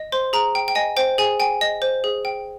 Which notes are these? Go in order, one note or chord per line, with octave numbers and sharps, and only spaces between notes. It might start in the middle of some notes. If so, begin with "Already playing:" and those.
Already playing: D#5
C5 C6
G#4 A#5
G5
G5
D#5 G#5
C5 G5
G#4 G#5
G5 G#5
D#5
C5
G#4
G5